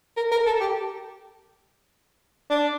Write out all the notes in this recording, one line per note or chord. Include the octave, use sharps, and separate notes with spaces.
A#4
A#4
A4
G4
D4